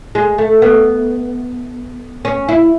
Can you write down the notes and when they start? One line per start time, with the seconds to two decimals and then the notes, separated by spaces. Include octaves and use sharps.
0.15 G#3
0.38 A3
0.62 B3
2.25 C#4
2.49 E4